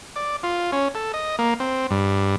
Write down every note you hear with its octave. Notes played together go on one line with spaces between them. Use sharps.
D5
F4
C#4
A4
D#5
A#3
C4
G2